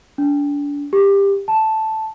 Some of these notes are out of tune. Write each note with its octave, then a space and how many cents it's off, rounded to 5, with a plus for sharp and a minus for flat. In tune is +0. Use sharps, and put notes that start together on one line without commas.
D4 -30
G4 +20
A5 -5